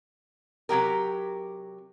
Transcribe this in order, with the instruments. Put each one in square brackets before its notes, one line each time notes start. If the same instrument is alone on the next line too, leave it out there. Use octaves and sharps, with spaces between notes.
[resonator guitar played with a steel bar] C3 F#3 G4 A#4